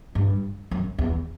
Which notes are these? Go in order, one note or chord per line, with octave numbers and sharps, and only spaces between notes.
G2
F#2
E2